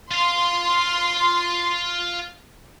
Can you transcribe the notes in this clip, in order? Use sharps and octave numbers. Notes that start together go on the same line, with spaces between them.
F4 F5 C6